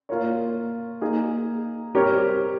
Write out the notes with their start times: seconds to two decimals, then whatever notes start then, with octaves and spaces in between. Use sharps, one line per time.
0.09 A#3 F4 A#4 C#5
1.01 A#3 D#4 G#4
1.95 G3 C4 G4 A#4 C#5